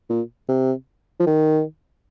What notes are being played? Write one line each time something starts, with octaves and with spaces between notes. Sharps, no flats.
A#2
C3
F3
D#3